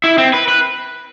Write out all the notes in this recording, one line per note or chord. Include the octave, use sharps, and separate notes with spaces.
E4
C4
B4
B4